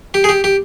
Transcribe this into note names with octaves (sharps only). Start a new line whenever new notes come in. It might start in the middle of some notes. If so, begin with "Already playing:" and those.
G4
G#4
G4
G4